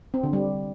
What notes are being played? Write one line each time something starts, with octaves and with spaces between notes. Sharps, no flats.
C4
D3
G3